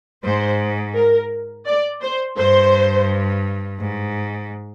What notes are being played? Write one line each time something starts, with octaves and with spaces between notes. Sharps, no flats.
G#2 C5
A#4
D5
C5
G2 C5
G#2